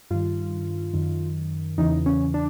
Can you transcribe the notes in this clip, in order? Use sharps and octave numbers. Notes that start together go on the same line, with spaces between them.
G2 D#3 F4
F#2 D#3
E2 C#3 E3 D#4
C#4
D4